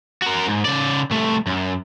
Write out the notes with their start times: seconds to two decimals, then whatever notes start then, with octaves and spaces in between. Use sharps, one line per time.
0.22 F#4 A#4
0.47 G#2
0.65 C#3 D5
1.11 C2 A3
1.47 F#2